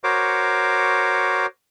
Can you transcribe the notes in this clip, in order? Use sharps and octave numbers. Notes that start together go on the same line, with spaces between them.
F#4 A#4 C5 C#5 D6